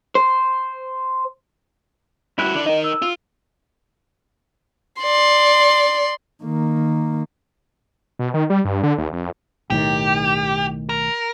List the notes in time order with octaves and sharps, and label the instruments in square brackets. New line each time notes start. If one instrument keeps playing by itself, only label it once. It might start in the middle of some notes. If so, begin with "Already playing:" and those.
[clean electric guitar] C5
[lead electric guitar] G2 F#4 [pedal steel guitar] E4 F#6
[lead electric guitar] D3 D4
[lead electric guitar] D#4 A#4 [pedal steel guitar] D#5
[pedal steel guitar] E6
[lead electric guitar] F4
[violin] D5 C6
[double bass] D#3 A#3
[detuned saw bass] B2
D#3
G3
G2
D3
D#2
F2
[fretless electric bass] B1 A2 D#3 [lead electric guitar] G4
[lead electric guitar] A#4